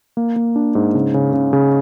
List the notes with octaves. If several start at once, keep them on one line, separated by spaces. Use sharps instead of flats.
A#3
A#3
D4
G#2
C#3
C#3
C#3
C#3